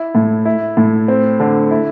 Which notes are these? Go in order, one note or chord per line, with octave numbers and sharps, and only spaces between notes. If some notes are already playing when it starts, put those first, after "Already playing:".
Already playing: E4
A2
E4
A2
C4
D3
E4